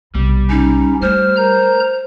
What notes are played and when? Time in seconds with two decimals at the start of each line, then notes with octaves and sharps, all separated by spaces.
0.15 B1 C3 G3
0.50 C#4 D#4
1.02 A3 C5 F6
1.37 A#4 A#5 G6